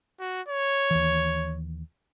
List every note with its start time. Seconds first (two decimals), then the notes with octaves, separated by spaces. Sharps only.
0.20 F#4
0.48 C#5
0.91 D#2 E3